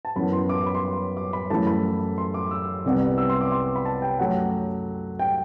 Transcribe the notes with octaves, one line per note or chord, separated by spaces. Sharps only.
A5
F#2 E3 B3 B5
C6
D6
C6
B5
C6
D6
B5
F#2 E3 A3 A5
B5
C6
D6
E6
C2 C3 G3 B3
E6
C6
D6
C6
B5
A5
G5
F#2 F#3 A3 F#5
G5